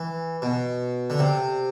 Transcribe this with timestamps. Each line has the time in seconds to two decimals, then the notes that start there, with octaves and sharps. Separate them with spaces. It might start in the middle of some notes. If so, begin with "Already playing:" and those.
Already playing: E3
0.42 B2
1.10 D3
1.19 C3